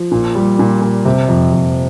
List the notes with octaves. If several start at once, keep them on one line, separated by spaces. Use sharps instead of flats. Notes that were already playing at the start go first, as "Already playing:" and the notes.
Already playing: F3
A#2
G3
A#2
A#2
C3
F2
F2